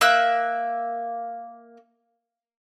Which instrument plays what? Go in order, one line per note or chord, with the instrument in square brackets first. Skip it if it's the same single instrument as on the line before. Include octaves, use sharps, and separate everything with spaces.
[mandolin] A#3 E5 E6 F#6